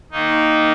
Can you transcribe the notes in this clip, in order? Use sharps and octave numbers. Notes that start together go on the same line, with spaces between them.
D#3 A#3 D#4